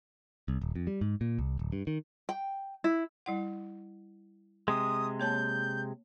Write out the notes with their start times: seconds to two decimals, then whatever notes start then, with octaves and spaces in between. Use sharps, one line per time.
0.48 C2
0.61 D#1
0.75 F2
0.87 G3
1.01 G#2
1.21 A#2
1.39 C2
1.59 D1
1.72 G2
1.87 D#3
2.29 G5
2.84 E4
3.26 G3 E4 F#5
4.68 C3 G#3 D#6
5.20 A#3 C#5 A5 G6